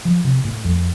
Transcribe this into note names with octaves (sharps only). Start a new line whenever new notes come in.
F3
C3
A2
F2